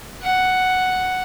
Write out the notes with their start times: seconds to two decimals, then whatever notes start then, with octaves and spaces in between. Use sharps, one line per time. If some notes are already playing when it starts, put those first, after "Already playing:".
0.22 F#5